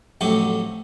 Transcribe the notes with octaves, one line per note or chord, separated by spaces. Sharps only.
A1 F2 F#3 C#4 G4